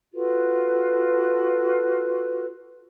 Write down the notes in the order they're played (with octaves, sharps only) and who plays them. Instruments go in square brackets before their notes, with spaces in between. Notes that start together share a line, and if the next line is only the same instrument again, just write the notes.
[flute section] F4 F#4 A4 B4